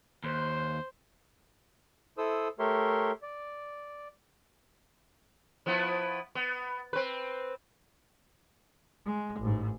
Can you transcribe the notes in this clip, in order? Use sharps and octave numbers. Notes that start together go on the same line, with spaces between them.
D#2 C5
E4 A4 C5 D#6 E6
A3 G4 A#4 C#5 E5 C6
D5
F3 B3 E4
B3
C4 B4
G#3
A1 G#2